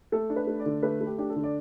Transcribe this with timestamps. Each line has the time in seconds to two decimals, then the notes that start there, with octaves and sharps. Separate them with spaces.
0.12 A3 A4
0.30 D4
0.36 B4
0.47 A3
0.60 D5
0.66 D3
0.83 A3 B4
1.01 A3
1.06 G4
1.18 D4 G4
1.30 A4
1.36 D3
1.43 D5